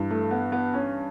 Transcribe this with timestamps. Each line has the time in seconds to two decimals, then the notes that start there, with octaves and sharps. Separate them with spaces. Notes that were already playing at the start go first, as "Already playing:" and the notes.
Already playing: G2 E3
0.11 A3
0.31 B3
0.52 B3
0.74 C#4